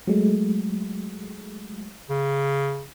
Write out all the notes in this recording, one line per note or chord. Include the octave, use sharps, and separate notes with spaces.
F#3 G#3 A3
C#3